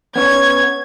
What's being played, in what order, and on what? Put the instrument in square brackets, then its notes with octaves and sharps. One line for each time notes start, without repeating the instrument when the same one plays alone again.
[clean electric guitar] B3 C#4 C#5 [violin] G#6